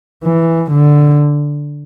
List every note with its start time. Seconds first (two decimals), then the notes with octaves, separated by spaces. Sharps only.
0.25 E3
0.71 D3